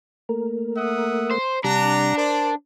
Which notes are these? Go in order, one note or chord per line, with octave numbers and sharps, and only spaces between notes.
A3 A#3 A#4
E5 F#5 D#6
C5
C3 G3 D4 F#5 A#5
A#4 C5 D5